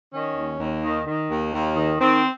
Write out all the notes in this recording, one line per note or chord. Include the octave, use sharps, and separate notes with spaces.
D#3 C#4
D#2
D#2
D#3
D#3
D#2
D#2
D#3
D#3 C4